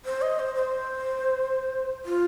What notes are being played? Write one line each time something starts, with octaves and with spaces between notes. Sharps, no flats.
C5
D#5
C5
C5
F4